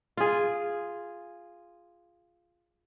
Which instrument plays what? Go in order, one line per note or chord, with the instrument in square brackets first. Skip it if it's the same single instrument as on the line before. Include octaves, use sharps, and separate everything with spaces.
[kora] F4 G#4